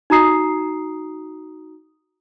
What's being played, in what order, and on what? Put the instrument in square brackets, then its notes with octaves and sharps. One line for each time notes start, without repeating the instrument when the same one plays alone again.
[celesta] D#4 F#4 A#5 D#6 C7